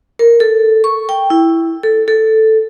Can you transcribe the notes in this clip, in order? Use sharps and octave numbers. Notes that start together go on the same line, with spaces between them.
A#4
A4
C#6
G5
E4
A4
A4